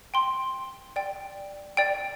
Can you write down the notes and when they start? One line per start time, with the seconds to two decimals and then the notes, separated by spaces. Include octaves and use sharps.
0.14 G5 C6
0.96 D5 G5
1.77 D5 G5